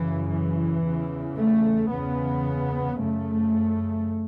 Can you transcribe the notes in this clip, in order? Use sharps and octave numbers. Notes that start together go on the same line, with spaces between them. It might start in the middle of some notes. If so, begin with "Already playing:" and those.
Already playing: F#2 C#3 E3
E3
E2 C#3
A3
E2 C#3 B3
F#2 C#3 A3